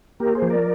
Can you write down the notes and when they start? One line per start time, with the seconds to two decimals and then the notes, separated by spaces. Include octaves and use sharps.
0.20 A#3 G4 A#4
0.35 G#4 C5
0.42 F3
0.50 A#4 D5